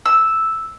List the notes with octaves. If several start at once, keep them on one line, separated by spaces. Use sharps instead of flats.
E6